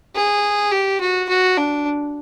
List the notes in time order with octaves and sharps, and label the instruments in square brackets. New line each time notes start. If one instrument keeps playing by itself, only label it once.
[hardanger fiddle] G#4
G4
F#4
F#4
D4